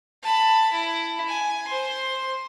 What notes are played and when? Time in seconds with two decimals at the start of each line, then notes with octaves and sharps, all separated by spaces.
0.23 A5 B5
0.72 E4
1.28 G#5
1.68 C5 C6